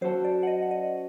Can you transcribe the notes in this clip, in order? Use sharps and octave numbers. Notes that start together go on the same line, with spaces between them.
F#2 F#3 C4 F#4 A4 C5
D5
F#5
D#5
F#5
D#5